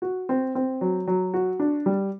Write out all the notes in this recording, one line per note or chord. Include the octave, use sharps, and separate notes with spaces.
F#4
C4
C4
F#3
F#3
F#4
D4
G3